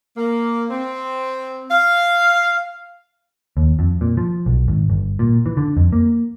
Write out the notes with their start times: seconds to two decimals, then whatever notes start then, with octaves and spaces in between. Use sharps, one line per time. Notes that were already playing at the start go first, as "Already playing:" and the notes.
0.17 A#3
0.70 C4
1.71 F5
3.57 D#2
3.79 F2
4.01 A#2
4.17 F3
4.46 B1
4.68 G#1
4.90 G1
5.19 A#2
5.46 E3
5.57 D3
5.77 F2
5.92 A#3